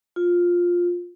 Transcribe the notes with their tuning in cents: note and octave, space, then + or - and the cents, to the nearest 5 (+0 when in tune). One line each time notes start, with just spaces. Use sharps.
F4 +10